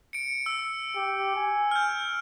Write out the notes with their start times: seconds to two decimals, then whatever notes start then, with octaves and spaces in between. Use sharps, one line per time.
0.13 C#7 D7
0.46 E6
0.96 G4
1.36 G#5
1.71 F6 G6